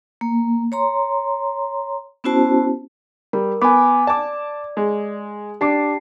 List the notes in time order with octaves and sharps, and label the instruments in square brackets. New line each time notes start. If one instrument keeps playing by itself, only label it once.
[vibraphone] A#3
C#5 A#5 C6
B3 C#4 E4 F#4 C5 A5
[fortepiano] G3 [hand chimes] A#4
[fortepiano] B3 [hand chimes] G#5 D6
[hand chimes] D5 [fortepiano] A5 D6
[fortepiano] G#3
[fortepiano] D4 D6 [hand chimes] G4 A5 C7